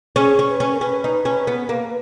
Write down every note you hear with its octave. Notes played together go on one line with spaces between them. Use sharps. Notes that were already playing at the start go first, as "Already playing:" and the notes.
C#4 G#4
C#4
B4
C#4
A#4
C#4 B4
D#4
C#4
B3
A#3